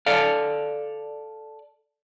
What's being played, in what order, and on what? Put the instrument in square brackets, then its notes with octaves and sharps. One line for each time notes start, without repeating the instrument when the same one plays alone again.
[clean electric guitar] A4 D5 F5